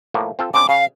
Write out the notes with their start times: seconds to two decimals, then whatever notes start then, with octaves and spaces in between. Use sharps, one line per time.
0.14 A2 F3 A#3
0.39 C4 F4 A4
0.54 C#3 C4 D4 D6
0.69 C#3 F5